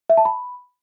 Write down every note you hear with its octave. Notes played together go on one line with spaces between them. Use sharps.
E5
A5
B5